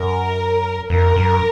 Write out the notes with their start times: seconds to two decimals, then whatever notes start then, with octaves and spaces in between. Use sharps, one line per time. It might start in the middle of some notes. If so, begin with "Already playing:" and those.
Already playing: F#2 A#4
0.90 F2 A#4
1.16 F#2